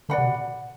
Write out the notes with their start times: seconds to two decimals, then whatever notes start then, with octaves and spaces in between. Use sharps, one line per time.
0.09 D3 D5 F#5 B5
0.18 C3
0.25 B2